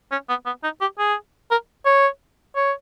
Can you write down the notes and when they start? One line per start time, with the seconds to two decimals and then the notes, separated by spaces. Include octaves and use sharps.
0.12 C#4
0.29 B3
0.46 B3
0.64 D#4
0.81 G4
0.98 G#4
1.51 A#4
1.86 C#5
2.56 C#5